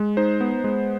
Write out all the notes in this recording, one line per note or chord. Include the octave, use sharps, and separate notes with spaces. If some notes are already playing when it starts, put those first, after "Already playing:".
Already playing: G#3
D#4 C5
B3
G#3